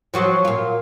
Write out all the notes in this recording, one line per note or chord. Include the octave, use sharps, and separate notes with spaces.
F3 F#3 F#4
A#2 F4